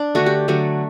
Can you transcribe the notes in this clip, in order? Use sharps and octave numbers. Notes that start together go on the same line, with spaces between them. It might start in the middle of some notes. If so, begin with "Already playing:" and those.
Already playing: D4
D3 A3 F#4
G4
D3 F#3 A3